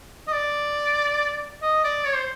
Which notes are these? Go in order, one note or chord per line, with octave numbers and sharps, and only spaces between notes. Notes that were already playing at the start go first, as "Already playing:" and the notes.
D#5
D5
D#5
D5
C#5
C5